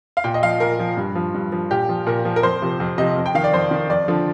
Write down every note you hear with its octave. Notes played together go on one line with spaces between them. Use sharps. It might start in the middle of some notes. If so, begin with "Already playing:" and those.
F5
A#2 G5
D#5
F3 F5
A#2 A#4
F3
G2
F3
G2
F3
A#2 G4
F3
A#2 A#4
F3
A#4
F2 C5
C3 F3
F2
C3 F3 D#5
F2
G5
D#3 F5
D5
F2 C5
D#3
F2 D5
D3 F3